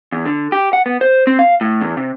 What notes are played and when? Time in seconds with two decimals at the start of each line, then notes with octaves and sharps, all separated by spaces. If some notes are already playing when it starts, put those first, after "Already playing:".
0.12 E2
0.26 D3
0.52 G4
0.73 F#5
0.86 B3
1.01 C5
1.27 C4
1.39 F5
1.61 A2
1.81 E2
1.97 C3